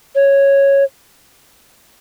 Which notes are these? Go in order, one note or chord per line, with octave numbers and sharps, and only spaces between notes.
C#5